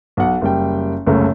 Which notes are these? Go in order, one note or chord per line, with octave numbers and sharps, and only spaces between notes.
B1 F#5
F#1 G3 G5
F#1 C2 C#3 A3 C#4 A#4